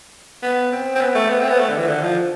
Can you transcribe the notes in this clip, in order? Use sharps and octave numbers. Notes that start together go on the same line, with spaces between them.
B3
C4
C4
B3
A3
B3
C4
B3
A3
D3
E3
D3
F3